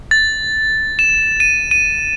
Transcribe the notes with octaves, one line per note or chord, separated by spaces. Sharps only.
A6
E7
D#7
D#7